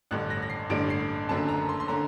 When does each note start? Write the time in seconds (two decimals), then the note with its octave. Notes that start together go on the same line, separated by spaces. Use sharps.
0.11 A1 G2 D3 F#6
0.30 A#6
0.42 A#6
0.50 C7
0.70 A1 G2 D3 D7
0.90 C7
1.29 F#1 F#2 D3 A5
1.49 A#5
1.69 C6
1.80 C6
1.88 D3 A#5